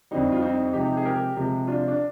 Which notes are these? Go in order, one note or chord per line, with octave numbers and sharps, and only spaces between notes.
F2 D3 G3 C4 D#4
F4
C4 D#4
C3 F3 G#3 D#4 G4
G#4
G4 A#4
C3 F3 G#3
D4 F4
D4